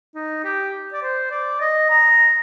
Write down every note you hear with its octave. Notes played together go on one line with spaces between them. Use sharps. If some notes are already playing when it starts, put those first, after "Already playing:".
D#4
G4
D5
C5
D5
D#5
A#5